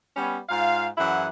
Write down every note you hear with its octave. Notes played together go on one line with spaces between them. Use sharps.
G3 B3 C#4
G#2 F4 F5
F#2 E3 E4 G#4 F#5